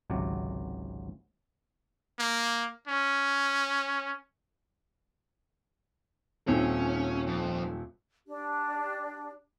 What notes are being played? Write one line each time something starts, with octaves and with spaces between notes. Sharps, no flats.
G#1 C#2 C3 F#3 D5
A#3
C#4
D#1 C4 C#4
F2
D4 G4